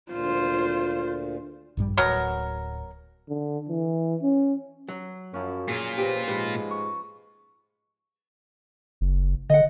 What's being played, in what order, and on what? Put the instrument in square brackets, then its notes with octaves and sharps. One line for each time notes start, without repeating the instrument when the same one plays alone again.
[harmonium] D2 A#2 [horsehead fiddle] F4 C5
[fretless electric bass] A#1 G2 G3
[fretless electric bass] D1 [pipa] B2 F#3 A#4
[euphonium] D3
E3
C#4
[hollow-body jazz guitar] F#3
[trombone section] F#2 [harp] F3 C#4
[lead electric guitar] A#2 F4 [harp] G#4
[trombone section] A1 B4 C5 [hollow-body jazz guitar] G4
[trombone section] G#2 F3 G#3 [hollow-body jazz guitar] G4 [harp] B4
[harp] C#6
[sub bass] F#1
[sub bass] D3 [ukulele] D#5 F#5